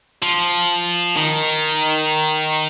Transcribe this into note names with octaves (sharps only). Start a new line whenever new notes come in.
F3
D#3